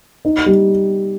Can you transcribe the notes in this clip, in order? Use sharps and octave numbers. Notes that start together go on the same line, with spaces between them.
D#4
G3